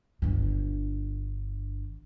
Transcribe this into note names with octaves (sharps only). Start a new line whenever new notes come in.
G1 D3